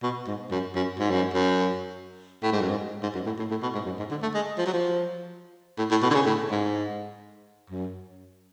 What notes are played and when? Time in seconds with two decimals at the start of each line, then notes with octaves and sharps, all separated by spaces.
0.03 B2
0.27 G#2
0.51 F#2
0.75 F#2
0.99 G#2
1.10 F#2
1.34 F#2
2.43 A2
2.52 G#2
2.61 F#2
2.70 G#2
3.03 G#2
3.14 F#2
3.26 A2
3.39 A2
3.51 A2
3.62 B2
3.75 G#2
3.86 F#2
3.99 G#2
4.11 D3
4.22 A3
4.34 G#3
4.58 F3
4.66 F#3
4.73 F3
5.78 A2
5.91 A2
6.02 B2
6.10 D3
6.14 C#3
6.26 A2
6.51 G#2
7.70 F#2